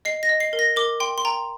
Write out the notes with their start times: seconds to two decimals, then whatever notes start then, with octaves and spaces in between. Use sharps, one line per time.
0.05 D#5 C7
0.23 A#6
0.29 D#5
0.40 C7
0.53 A#4
0.59 A#6
0.76 A#4 D6
1.00 G5 C6
1.18 C6
1.25 G5 A#5